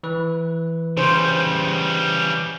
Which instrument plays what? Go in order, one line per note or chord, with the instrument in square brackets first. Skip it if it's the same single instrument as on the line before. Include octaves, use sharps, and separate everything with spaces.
[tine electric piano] E3 B4
[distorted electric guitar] C#3 G3 [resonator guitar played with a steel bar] C5